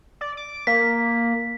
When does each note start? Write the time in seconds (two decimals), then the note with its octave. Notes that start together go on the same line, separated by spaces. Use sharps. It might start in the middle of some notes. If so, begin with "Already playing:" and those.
0.21 D5
0.37 D6
0.67 A#3 B6